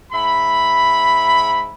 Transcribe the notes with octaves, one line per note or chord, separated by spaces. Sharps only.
G#2 E5 B5